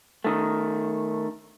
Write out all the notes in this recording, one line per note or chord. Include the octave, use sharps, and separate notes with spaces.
D#3 A3